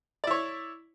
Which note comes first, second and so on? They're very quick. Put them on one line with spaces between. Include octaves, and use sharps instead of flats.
D5 E4 C#5